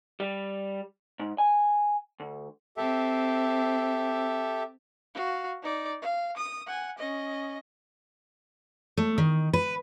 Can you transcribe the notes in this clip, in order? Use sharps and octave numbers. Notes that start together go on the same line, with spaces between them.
G3
G#2
G#5
D2
C4 G4 A4 E5
F#4 F5
D#4 D5
F5
D#6
F#5 G#5
C#4 D#5
A3
D#3
B4